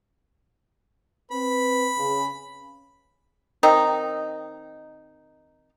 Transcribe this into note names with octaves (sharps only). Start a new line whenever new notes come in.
C4 B4 B5
C#3
D#3 C4 D#4